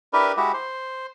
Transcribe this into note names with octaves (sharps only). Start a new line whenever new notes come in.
D4 E4 G4 A#4 B4
G#3 E4 F#4 G4
C5